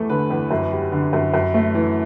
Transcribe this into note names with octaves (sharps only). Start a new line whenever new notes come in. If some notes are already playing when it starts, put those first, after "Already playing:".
Already playing: E2 A3 A4
D3 B4
E2
F#2
G3
D3
F#2
F#2
A3
E3